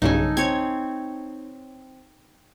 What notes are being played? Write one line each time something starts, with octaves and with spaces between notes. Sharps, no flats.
B1 G2 C#3 D#4 A4 G#5
C4 C#5 G#6